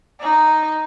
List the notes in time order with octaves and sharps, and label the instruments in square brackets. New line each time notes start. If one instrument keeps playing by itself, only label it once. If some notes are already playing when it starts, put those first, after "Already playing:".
[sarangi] D#4